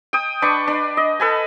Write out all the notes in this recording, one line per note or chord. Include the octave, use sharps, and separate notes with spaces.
G5 D#6
D4 B4 C#6
D4
D#5
A4 B4 G#5